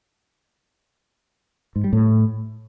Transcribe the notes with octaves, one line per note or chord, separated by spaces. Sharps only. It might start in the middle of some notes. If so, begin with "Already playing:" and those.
G#2
G3
A2